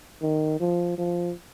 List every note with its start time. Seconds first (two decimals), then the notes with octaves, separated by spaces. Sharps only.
0.22 D#3
0.60 F3
0.98 F3